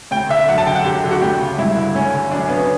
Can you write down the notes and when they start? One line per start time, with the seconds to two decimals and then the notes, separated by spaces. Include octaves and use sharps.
0.11 D2 G5
0.29 D3 E5
0.48 F#2 F#5
0.58 A5
0.66 D3 G5
0.75 F#5
0.84 F#2 G4
1.04 D3
1.11 F#4
1.21 D2 G4
1.40 C#3
1.58 G2 E4
1.77 D3
1.95 D2 C#4
2.14 D3
2.31 F#2 D4
2.40 C#4
2.49 C#3 B3
2.57 C#4